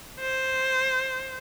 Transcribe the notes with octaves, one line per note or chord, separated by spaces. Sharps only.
C5